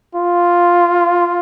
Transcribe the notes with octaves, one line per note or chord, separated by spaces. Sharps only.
F4